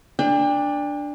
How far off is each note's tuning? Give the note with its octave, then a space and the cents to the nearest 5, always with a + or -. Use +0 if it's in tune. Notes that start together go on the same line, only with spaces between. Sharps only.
D4 +0 G5 +40